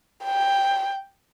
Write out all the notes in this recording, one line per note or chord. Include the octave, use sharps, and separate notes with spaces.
G5